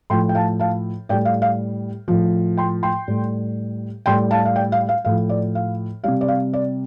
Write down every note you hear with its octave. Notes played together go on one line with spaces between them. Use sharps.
A2 F3 G5 C6
G5
F5 A5
F5 A5
A2 G3 D5 G5
F5
F5
A2 F3
G5 C6
G5 C6
A2 G3
A2 G3 G5 C6
F5 A5
F5
D5 G5
F5
F5
A2 F3 F5
D5
F5
C3 G3 F5
D5
F5
D5